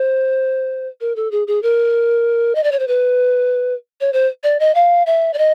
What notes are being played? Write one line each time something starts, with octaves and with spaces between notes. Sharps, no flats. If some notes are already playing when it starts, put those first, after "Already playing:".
Already playing: C5
A#4
A4
G#4
G#4
A#4
D#5
D5
C#5
C5
B4
C#5
C5
D5
D#5
F5
E5
D5
D#5